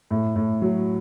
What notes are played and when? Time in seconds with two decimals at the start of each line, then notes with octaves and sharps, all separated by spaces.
0.11 A2
0.36 A2
0.62 F#3